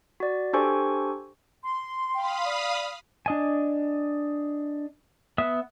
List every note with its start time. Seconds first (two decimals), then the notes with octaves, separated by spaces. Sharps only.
0.20 F#4 D5
0.53 D4 G4 A4 C5 G#5 C#6
1.63 C6
2.14 F5 G5 B5 D#6
2.45 D5
3.26 D4 D#5 G#5
5.38 B3 E5 D#6